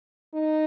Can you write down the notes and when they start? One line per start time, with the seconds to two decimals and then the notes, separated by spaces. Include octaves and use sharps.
0.33 D#4